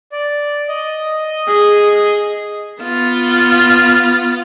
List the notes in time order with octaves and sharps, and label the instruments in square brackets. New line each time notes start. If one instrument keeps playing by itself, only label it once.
[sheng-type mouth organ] D5
D#5
[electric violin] G#4
[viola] B3 F4